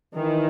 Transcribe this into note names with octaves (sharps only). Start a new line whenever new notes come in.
D#3 E3